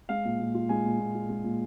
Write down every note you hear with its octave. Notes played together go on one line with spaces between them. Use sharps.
G#3 F5
A#2
A#2
F4
G#3 G#5
A#2
A#2
F4
G#3
A#2